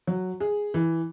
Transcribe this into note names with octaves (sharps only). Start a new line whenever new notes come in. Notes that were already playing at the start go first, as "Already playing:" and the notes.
F#3
G#4
E3